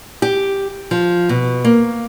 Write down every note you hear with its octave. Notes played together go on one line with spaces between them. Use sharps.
G4
F3
B2
A#3